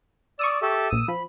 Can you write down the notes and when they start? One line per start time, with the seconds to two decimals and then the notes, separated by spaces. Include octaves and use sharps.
0.39 D5 C#6 D#6 E6
0.62 G4 A4 E5
0.90 A#1 D#6 E6 D#7
1.08 F3 B5